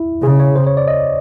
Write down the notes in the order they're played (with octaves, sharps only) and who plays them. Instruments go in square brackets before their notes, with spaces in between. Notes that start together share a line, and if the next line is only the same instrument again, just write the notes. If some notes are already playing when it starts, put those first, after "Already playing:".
Already playing: [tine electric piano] E4
[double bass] C#3 [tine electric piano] G#4
[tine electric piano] C#5
C5
C#5
D5
D#5